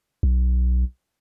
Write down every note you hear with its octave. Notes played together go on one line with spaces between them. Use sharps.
B1